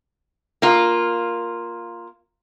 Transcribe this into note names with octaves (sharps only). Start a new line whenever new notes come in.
A#3 F4